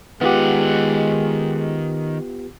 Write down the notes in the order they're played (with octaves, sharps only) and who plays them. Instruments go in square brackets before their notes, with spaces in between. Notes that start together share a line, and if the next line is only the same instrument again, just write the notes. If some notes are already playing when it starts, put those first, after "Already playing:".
[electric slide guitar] D#3 F#5 [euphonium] G#3 [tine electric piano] B3 F4 G4